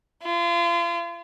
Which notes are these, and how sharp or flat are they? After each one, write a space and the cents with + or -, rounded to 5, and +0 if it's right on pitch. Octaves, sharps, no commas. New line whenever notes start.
F4 -35